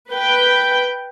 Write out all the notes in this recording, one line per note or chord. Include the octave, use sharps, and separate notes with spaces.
B4 G5